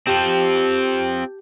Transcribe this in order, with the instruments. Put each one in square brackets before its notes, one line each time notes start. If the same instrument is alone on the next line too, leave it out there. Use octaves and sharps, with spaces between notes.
[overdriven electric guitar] C4 F4 [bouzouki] G4 G5 A5